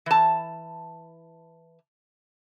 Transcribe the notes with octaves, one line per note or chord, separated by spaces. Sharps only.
E3 A5